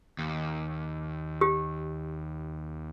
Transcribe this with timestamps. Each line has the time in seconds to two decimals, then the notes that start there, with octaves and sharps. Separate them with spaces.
0.19 D#2
1.41 G4